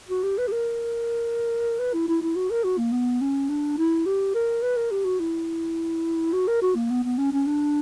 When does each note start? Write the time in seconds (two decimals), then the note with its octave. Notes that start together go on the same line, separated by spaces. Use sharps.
0.09 F#4
0.23 G4
0.38 B4
0.47 G4
0.52 A#4
1.79 B4
1.93 E4
2.08 E4
2.21 E4
2.36 F#4
2.50 A#4
2.64 F#4
2.78 A#3
2.92 B3
3.21 C#4
3.49 D4
3.78 E4
4.06 G4
4.34 A#4
4.62 B4
4.77 A#4
4.91 G4
5.05 F#4
5.20 E4
6.33 F#4
6.47 A#4
6.62 F#4
6.75 A#3
6.90 B3
7.04 B3
7.18 C#4
7.33 C#4
7.47 D4